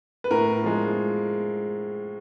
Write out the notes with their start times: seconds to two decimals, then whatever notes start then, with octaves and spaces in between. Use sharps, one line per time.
0.24 B4
0.31 A2 A#4
0.64 F3 G#3